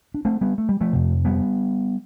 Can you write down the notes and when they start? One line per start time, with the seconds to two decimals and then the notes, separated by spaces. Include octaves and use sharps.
0.14 D4
0.25 A3 C4
0.41 G3 B3
0.58 A3
0.69 G3
0.81 F3 A3
0.93 F2 C3
1.25 G3 B3